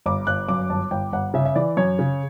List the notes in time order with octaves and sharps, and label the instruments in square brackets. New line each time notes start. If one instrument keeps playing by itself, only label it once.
[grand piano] G1 D6
G1 F#6
F#2 D6
G1 A5
G1 G5
G1 F#5
C#3 E5
E5
E3 D5
F#2 C#5
C#3